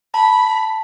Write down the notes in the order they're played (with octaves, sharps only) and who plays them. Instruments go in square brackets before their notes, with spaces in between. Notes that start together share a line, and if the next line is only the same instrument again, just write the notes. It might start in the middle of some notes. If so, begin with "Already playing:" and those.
[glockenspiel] A5 [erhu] B5